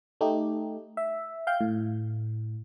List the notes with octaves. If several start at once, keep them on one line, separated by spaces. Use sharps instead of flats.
A3 D#4 G4
E5
F5 G5 G6
A2